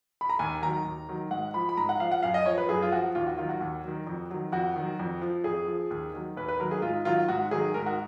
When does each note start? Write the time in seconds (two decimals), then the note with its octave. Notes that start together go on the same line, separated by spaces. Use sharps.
0.21 B5
0.29 A#5
0.39 D#2 G#5
0.62 D#3 F#3 A#5
0.85 D#2
1.09 D#3 F#3
1.31 G#2 F#5
1.54 F3 B5
1.69 B5
1.77 G#2 A#5
1.89 F#5
2.00 F3 F5
2.11 F#5
2.23 F#2 F5
2.34 D#5
2.46 F3 C#5
2.58 B4
2.69 F#2 G#4
2.82 F4
2.92 F3 F#4
3.15 D#2 F4
3.27 F#4
3.38 D#3 F#3 F4
3.49 F#4
3.60 D#2
3.84 D#3 F#3
4.07 F2
4.30 D#3 F#3
4.52 F2 F#4
4.76 D#3 F#3
4.99 F2
5.21 F3
5.44 F2 G#4
5.67 F3
5.90 D#2
6.14 D#3 F#3
6.37 D#2 B4
6.48 B4
6.59 D#3 F#3 A#4
6.71 G#4
6.82 G#2 F4
7.05 D#3 F#3 F4
7.28 G#2 F#4
7.51 D#3 F#3 G#4
7.74 G#2 A#4
7.86 F#4